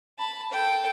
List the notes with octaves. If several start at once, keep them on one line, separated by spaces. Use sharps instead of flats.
A5 B5
A4 G5